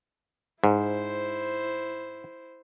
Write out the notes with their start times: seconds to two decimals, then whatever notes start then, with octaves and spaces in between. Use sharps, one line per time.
0.64 G#2 E4 C5